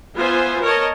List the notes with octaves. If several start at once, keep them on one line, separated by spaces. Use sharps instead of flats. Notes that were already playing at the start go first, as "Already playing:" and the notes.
B3 F4 C5 E5 G#5
A#4 C#5 D#5 A5